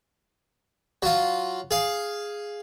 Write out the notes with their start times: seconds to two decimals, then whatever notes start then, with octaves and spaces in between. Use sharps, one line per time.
1.02 F#3 F4
1.71 G#4 F5